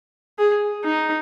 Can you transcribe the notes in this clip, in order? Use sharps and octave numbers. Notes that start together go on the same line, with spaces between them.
G#4
D#4